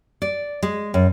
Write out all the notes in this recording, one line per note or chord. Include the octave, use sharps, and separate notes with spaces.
D5
G#3
F#2